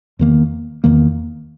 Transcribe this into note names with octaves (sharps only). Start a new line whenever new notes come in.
E2 D#3 A#3
E2 D#3 A#3